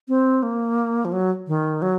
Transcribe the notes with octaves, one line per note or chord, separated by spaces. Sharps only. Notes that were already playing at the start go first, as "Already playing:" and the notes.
C4
A#3
F3
F#3
D#3
F#3